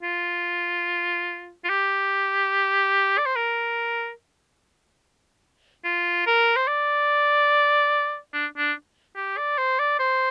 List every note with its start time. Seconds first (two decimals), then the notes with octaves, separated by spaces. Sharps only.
0.03 F4
1.64 F4
1.70 G4
3.18 D5
3.26 C5
3.36 A#4
5.85 F4
6.27 A#4
6.56 C5
6.68 D5
8.33 D4
8.58 D4
9.16 G4
9.37 D5
9.58 C5
9.79 D5
10.00 C5